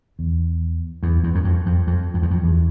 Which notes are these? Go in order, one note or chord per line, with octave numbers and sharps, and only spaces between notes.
E2
E2
E2
F#2
F2
F2
F2
F2
E2
F2
E2